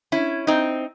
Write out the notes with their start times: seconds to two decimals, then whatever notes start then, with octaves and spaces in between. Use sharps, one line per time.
0.12 C#4 E4
0.47 C4 D#4